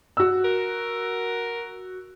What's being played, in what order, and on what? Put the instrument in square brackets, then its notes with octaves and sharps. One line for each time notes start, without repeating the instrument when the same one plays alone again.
[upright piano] F#4 E6
[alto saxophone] A#4